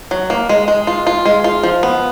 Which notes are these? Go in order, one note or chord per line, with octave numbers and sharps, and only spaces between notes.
F#3
A#3
G#3
G#3
F4
F4
G#3
F4
F3
B3